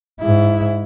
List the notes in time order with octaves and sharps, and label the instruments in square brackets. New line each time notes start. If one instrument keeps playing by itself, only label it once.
[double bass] G#2 E4